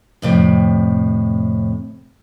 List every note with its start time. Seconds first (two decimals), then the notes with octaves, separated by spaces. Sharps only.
0.22 F2 A2 C3